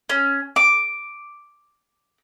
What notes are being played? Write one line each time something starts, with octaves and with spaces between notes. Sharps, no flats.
C#4
D6